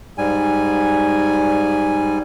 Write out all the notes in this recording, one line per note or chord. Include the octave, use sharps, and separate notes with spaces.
G#2 G3 G#5